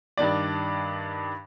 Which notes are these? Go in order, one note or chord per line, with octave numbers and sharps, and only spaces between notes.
G2 D#3 D4 D5